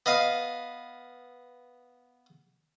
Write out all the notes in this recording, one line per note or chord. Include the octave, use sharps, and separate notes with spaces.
B3 D#5 F5